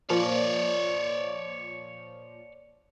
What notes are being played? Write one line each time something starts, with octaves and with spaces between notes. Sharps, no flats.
A#2 F3 C#5 D5